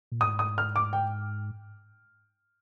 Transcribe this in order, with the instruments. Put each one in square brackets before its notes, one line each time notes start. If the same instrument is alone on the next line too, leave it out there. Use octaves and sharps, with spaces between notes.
[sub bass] A#2
[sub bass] G#2 [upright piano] D#6
[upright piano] D#6
F6
D6
G5